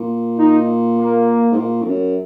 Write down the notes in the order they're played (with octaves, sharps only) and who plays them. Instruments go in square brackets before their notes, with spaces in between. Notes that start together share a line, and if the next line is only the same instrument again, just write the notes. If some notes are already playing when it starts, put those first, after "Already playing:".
Already playing: [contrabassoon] A#2
[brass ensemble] D#4
A#3
[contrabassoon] G#2
A#2
F2
F#2